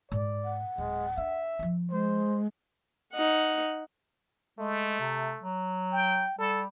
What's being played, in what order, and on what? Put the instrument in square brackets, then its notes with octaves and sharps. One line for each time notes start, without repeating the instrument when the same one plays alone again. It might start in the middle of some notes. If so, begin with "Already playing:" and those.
[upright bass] G#2 [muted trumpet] D5
[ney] F#5
[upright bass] D1 [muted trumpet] G#3
[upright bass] D4 [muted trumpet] E5
[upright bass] F3 D#4
[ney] G#3 [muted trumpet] C5
[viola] D#4 F#5
[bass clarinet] G#3 [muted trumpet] A3
[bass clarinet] C3
F#3
[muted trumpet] G5
[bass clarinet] G3 [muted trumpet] A4